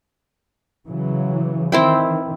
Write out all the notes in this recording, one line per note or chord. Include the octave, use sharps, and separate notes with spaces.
C#3 E3 F#3
D#3 E3 C4 E4 G5